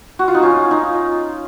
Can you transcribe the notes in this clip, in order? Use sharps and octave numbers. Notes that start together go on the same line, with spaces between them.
F#4
F4
D#4
C#4 F4
D#4